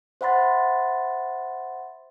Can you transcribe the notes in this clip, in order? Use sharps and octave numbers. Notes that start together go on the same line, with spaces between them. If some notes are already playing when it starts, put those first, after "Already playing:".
C5 E5 F#5 B5 C6 A6